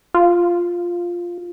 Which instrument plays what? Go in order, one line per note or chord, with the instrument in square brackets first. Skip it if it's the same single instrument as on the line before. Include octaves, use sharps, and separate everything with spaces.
[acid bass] F4